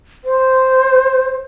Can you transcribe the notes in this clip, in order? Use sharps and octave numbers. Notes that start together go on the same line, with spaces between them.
C5